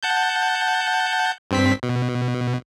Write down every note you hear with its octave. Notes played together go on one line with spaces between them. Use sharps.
F#5 A5 G6
G2 C4 B6
B2